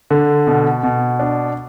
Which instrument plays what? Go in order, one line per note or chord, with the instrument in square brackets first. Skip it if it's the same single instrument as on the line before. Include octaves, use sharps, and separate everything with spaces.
[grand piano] D3
B2
B2
D4